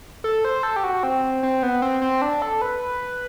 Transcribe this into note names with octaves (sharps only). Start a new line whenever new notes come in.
A4
C5
A4
G4
F#4
C4
C4
B3
C4
C4
D4
A4
B4